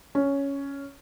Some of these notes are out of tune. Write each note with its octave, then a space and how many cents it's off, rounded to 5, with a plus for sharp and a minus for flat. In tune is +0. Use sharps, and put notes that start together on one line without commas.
C#4 +5